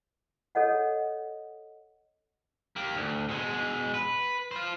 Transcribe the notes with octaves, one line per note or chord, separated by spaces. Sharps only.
A4 C#5 D#5 F#5
A#3 G4
D2
B2 G#3
B4
F4 C5